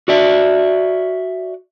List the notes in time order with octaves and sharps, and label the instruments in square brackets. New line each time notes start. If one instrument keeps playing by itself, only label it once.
[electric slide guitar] F#4 D5 E5